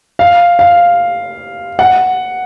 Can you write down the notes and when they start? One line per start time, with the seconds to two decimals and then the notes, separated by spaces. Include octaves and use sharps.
0.19 F5
0.59 F5
1.79 F#5